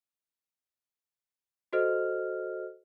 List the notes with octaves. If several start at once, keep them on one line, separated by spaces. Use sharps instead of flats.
F#4 A4 C5 D#5 F6